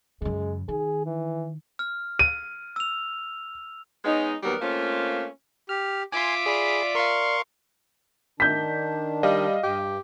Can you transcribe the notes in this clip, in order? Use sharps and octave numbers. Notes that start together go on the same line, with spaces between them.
F#2 C#3 G#3
D#3 G#4
E3
F6
D#7
E6 F7
G#3 B3 C#4 D#4
D#2 F#3 G3 B3 A#4
A3 A#3 C4 C#4 F4
G4 F6
F4 E5 G#5 C6 D6
G#4 D5 B5
A#4 F5 C6 C#6
D#3 D4 G6 B6
G3 D#5 F5
G2 G4